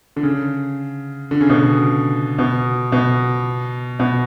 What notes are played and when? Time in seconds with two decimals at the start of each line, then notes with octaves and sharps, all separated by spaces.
0.16 D3
0.23 C#3
1.31 D3
1.41 C#3
1.50 B2
1.59 C#3
2.39 B2
2.92 B2
4.00 B2